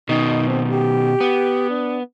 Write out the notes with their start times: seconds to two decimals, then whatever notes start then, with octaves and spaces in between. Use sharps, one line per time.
0.09 B2 D#3 D#4
0.48 C4
0.69 G4
1.20 B3
1.70 D4